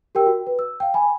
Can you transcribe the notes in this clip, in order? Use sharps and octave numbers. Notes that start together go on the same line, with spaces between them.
G4 A#4 G5 E6
F#4
B4
E6
F5 G5
G#5 B5